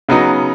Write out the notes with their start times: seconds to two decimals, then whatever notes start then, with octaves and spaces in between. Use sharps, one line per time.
0.09 C#3 F#3 B3 D#4